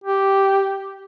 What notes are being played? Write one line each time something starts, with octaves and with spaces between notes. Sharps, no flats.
G4